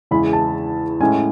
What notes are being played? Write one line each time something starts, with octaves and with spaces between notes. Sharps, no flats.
E2 C#3 E3 G#3 B5
A5
A2 G#3 C#4 G#5